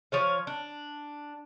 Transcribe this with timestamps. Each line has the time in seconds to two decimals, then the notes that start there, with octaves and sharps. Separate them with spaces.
0.12 F3 C#5 F5
0.47 D4